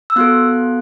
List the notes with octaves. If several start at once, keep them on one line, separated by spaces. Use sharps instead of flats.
E6
B3 F#4 A4 F#6